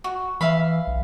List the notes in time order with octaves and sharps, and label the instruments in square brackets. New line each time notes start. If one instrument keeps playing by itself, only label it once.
[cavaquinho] F#4
[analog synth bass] E3 [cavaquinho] E5 F5 B5
[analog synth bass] B1